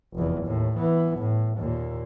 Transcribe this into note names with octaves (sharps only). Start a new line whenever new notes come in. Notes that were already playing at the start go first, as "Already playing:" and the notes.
F1 E2
D#2 A2
E3 B3
A2
D#2 A#2